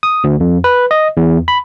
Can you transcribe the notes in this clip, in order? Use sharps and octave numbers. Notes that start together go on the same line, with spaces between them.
D#6
D2
F2
B4
D#5
E2
B5